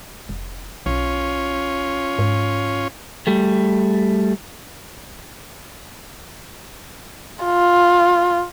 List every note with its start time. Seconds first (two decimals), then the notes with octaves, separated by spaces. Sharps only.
0.29 F1
0.86 B1 C#4 F4 C#5
2.19 G#2
3.27 G3 A3
7.44 F4